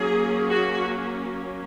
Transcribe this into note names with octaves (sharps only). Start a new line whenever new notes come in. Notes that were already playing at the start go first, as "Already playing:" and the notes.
Already playing: F#3 A#3 C#4 G#4
F#4